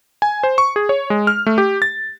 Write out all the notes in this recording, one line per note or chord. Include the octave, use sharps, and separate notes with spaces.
G#5
C5
C#6
G#4
C#5
G#3
F6
A3
G4
A6